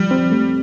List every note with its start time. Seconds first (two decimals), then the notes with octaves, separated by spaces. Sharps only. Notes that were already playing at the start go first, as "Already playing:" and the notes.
Already playing: F3 G3
0.11 C4
0.31 A3